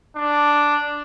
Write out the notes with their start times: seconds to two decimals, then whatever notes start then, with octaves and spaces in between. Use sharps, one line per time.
0.17 D4